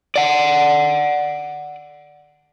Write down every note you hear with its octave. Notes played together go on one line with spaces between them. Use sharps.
D5 F#5